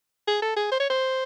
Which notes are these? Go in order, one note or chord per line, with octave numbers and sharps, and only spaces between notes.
G#4
A4
G#4
C5
C#5
C5